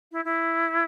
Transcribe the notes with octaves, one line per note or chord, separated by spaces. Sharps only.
E4
E4